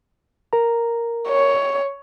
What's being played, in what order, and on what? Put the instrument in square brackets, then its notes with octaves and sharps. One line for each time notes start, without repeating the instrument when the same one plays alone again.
[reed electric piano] A#4 A#5
[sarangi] C#5